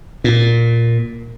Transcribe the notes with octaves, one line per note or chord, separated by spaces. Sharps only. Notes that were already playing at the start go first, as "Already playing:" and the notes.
A#2